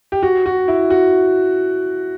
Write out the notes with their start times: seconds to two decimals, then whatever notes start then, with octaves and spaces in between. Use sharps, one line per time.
0.12 G4
0.23 F#4
0.46 F#4
0.68 E4
0.90 F#4